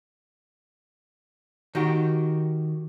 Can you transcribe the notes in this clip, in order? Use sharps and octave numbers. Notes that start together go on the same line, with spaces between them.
D#3 F#4 G4